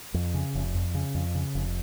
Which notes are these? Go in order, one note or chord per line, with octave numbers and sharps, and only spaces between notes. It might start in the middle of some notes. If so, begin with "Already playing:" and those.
F2
C#3
F1
F2
C#3
F2
C#3
F1